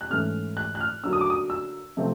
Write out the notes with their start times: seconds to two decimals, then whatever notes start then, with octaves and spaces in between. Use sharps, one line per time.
0.01 F#6
0.10 G#2 E3 A3 C#4 F6
0.57 F#6
0.75 F#6
0.81 F6
1.04 D3 F#3 A#3 E6
1.13 D#6
1.21 D6
1.30 D#6
1.50 E6
1.97 C3 F3 A3 C4